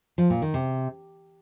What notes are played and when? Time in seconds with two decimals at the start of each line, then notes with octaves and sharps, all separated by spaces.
0.18 F3
0.30 A#2
0.42 D#3
0.54 C3